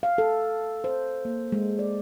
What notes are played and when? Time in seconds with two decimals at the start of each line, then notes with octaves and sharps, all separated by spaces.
0.03 F5
0.18 A4
0.84 C5
1.25 A#3
1.52 G#3
1.79 D5